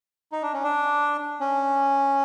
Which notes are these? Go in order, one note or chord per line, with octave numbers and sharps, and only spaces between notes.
D#4
D4
C#4
D4
C#4